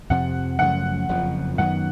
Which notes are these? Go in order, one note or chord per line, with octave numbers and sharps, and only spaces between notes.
F2 C3 F3 F#5
F#2 C#3 F3 A3 F#5
F#1 F2 C#3 F3
F#2 D#3 F#3 B3 F#5